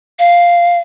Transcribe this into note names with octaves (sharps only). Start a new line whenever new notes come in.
F5